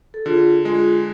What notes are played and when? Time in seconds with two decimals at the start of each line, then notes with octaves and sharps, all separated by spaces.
0.14 A4
0.25 D3 F4 G#4
0.65 G#3 F4 G#4